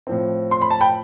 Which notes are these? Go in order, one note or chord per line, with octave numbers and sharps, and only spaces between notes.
A2 F3 C4
C6
B5
A5
G5 B5